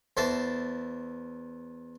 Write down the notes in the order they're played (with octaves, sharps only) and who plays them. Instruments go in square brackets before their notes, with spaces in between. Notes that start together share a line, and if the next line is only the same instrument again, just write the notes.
[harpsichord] E2 C5 E5 A5